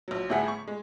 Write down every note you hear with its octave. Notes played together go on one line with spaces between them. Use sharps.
A#1 F#3
G1 A2 E4 G#4 F#5 B6
C#6
G#3